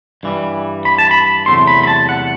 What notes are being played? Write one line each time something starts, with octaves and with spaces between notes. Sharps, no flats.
G2 E3 G3
B5
A5
B5
E2 C3 F#3 A3 E4 C6
B5
B5
A5
F#5